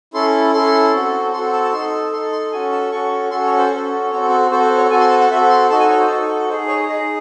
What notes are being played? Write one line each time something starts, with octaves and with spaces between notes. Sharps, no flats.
C#4 E4 A4 C6
C#4 E4 A4 C6
C4 F#4 A4
C4 F#4 A4 C6
A5
A5
D#4 A4 C6
D#4 A4 C6
C6
C#4 F#4 A4 G#5
A5
C#4 F#4 A4 C#6
C#4 F#4 A4 C6
C#5
C5
C#4 F#4 A4
C4 F#4 A4 C#5
A4
C4 F#4 A4 C5
C5
C#5
C4 F#4 A4 G#5
C6
A5
F#5
C4 F#4 A4 E5
C6
D#4 F#4 A4 A5
G#5
C#5
C5
D#4 F#4 A4
D#4 G#4 C5
C#5
D#4 G#4 D#5